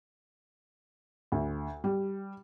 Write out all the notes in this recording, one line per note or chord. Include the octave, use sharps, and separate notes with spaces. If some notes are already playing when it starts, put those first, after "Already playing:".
D2
G3